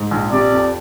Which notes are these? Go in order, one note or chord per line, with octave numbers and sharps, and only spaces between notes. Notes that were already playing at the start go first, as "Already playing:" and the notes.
Already playing: G#2
A#1
C3 D5
F2